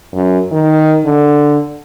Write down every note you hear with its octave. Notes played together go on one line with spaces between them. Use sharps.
F#2
D#3
D3